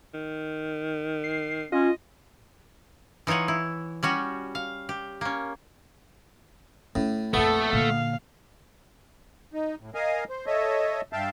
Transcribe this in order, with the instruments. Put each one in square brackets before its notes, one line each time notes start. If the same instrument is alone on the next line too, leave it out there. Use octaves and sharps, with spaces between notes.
[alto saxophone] D#3
[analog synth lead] C7
[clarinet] C#4 [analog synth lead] F4 [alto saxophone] D#5
[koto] E3 D#4 F4 C#5 F#5
E4
G3 C#4 F#4 G4
F5
G4
A#3 C#4
[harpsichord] A2 [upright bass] C#4
[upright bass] A#1 F2 [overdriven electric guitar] A3 [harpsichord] B3 [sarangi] A4
[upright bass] A#2 D3 [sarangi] F5
[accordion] D#4
A2
A#4 D#5 F5 G#5
C5
A4 C#5 D#5 E5
G2 E5 F5 G5 A5